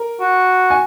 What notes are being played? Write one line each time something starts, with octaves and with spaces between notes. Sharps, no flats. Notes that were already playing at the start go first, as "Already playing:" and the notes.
Already playing: A#4
F#4
G#5